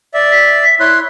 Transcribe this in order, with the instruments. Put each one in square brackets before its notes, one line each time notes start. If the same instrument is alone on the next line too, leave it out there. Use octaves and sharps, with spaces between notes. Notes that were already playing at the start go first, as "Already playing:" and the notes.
[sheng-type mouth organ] D5 E5
[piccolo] B6
[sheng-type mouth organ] E4 C#5 C6 [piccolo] F#6